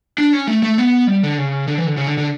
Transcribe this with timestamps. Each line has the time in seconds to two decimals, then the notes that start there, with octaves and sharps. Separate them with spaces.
0.18 D4
0.33 C#4
0.48 A3
0.63 A3
0.78 B3
1.07 G3
1.23 D3
1.38 C#3
1.68 D3
1.78 E3
1.87 D3
1.97 C#3
2.07 D3
2.18 D3